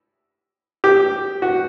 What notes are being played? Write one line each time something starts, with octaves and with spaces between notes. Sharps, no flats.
G4
F#4